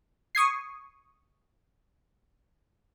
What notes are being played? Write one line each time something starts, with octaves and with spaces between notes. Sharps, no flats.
C#6 D#6 G#6 C7